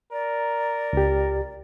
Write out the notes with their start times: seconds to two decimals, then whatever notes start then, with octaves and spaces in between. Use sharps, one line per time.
0.12 A#4 D5
0.93 C#2 G4